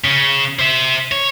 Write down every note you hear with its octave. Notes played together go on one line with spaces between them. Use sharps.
C#3
C5 E5
C#5